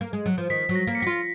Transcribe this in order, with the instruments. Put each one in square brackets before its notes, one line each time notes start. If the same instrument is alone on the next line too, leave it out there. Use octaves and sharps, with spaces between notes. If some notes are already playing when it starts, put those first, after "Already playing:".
[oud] A#3
G#3
F#3
F3
[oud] D#3 [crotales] B6
[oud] F#3 [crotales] B6
[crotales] A#6
[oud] A#3
[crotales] C#7
[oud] F#4 [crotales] B6
[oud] F4